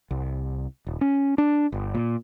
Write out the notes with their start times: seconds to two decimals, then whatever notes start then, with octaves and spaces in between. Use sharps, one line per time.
0.11 C2
0.87 D#1
1.01 C#4
1.38 D4
1.72 G1
1.95 A#2